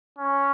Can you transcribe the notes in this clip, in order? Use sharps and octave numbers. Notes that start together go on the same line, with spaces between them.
C#4